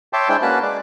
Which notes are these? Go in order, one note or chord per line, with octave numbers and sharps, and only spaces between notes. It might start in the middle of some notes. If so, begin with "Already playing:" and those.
C#5 E5 G5 A5 C6 D6
G#3 D4 E4 C5 G5
A#3 C#4 F#4 B4 A5 F#6
G#3 D5